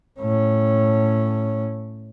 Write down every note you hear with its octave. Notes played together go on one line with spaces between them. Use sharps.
A2 C#4